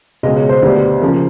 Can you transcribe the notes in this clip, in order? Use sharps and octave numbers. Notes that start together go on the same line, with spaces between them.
C#2 B2 G#3 D#5
C#5
C5
D2 D3 G3 B3
C#3 F3 A#3